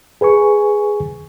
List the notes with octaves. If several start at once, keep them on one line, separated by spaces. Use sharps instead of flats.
G#4 B4 G#5 C#6